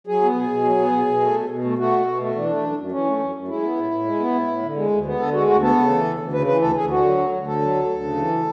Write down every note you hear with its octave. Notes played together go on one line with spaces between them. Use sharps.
F#3 G#4
B3
B2 G#4
B2
F#3
B3
B2
B2
A3
B2
B2
A3
A3 F#4
B2
B2
A3
E3 D4
A3
F#2
F#2
E3 C#4
A3
F#2
F#2
G#3 E4
B3
A2
A2
G#3
B3
A2
A2
D3
G#3
D2
B3
D3 A4
G#3 F#4
D2 F#4
B3 A4
C#3
E3
D2
D2
C#3 B4
E3 B4
D2 A4
D2 G#4
D3 F#4
F#3
D2
D2
D3 A4
F#3
D2
D2
C#3
E3